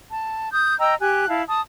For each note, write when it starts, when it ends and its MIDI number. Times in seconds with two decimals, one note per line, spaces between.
0.10 0.50 81
0.51 0.77 87
0.51 0.77 91
0.79 0.95 75
0.79 0.95 79
0.79 0.95 82
0.79 0.95 88
1.00 1.26 67
1.00 1.26 80
1.00 1.26 90
1.28 1.43 64
1.28 1.43 77
1.28 1.43 81
1.48 1.61 81
1.48 1.61 87